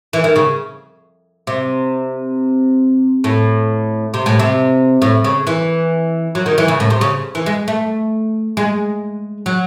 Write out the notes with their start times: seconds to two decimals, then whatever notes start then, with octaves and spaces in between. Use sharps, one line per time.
0.13 E3
0.24 D#3
0.36 C#3
1.47 C3
3.24 A2
4.14 C3
4.26 A2
4.39 C3
5.02 A2
5.24 C#3
5.47 E3
6.35 F#3
6.46 D#3
6.58 E3
6.68 C#3
6.80 A2
6.90 C3
7.01 C#3
7.35 E3
7.46 G#3
7.68 A3
8.57 G#3
9.46 F#3